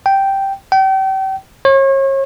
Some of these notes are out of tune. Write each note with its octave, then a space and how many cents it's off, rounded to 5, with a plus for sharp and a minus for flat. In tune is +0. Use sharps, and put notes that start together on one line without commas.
G5 -5
G5 -35
C#5 -35